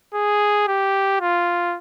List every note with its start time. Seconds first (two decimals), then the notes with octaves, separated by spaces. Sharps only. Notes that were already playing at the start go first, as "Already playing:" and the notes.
0.14 G#4
0.68 G4
1.21 F4